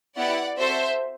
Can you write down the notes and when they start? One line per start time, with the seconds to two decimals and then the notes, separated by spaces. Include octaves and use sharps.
0.17 B3 E4 G4 D5 F#5
0.57 C4 F#4 A4 C5 E5